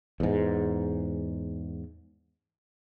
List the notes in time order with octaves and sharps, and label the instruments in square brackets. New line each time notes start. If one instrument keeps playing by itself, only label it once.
[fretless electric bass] E2 G#2